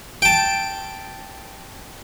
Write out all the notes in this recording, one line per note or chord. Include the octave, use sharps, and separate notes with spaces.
G5 A5